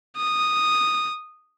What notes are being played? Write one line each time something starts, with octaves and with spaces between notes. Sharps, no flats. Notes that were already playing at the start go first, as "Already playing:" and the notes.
D#6